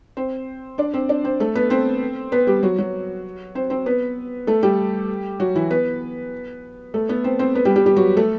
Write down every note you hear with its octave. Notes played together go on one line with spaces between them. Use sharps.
C4 C5
D4 D5
C4 C5
D4 D5
C4 C5
A3 A4
B3 B4
C4 C5
B3 B4
G3 G4
F#3 F#4
F#3 F#4
C4 C5
C4 C5
B3 B4
A3 A4
G3 G4
F#3 F#4
E3 E4
B3 B4
A3 A4
B3 B4
C4 C5
C4 C5
B3 B4
G3 G4
G3 G4
G3 G4
F#3 F#4
A3 A4